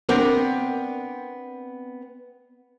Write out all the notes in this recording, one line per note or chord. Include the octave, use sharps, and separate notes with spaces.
B3 C4 D4 A#4 G5